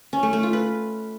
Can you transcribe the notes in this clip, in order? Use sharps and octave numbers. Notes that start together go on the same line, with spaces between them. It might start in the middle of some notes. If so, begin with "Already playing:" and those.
C#4
A3
A3
F4
B4